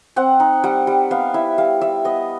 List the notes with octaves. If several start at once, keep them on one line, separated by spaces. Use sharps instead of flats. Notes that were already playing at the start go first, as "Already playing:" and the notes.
C4 F#5
D#4
G3 F#5
G3
B3 F5
E4 E5
G3 F5
G3 E5
B3 D#5